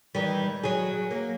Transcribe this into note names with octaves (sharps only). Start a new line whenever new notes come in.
D#3 E3 G3
F#3 G#4
A#3